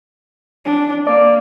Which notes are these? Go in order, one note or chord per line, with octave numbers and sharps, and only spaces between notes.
D4
A#3 D5